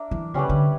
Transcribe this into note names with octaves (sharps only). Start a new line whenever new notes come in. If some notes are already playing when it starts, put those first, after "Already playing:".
Already playing: D4 A#4 E5
E3
C#3 G3 C#4 G4 B4
D3